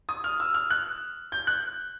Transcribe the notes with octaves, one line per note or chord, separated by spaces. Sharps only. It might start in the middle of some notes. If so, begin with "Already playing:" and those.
D#6
F6
E6
F6
F#6
G6
F#6